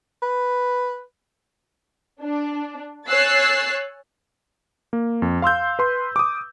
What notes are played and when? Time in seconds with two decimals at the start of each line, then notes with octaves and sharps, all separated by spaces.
0.22 B4
2.21 D4
3.07 C#5 G#5 E6 F#6 A6 C7
4.93 A#3
5.22 F2
5.42 F5 C6 E6 G6
5.79 B4 C6
6.16 D6 D#6